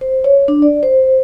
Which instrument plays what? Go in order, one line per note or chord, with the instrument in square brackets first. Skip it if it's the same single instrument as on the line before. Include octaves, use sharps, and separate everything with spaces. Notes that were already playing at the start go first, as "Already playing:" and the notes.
[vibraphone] C5
C#5
D4
D5
C5